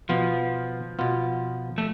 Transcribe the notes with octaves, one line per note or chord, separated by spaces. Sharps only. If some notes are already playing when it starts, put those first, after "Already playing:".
B2 F3 B3 F4
B2 B3 F4
A3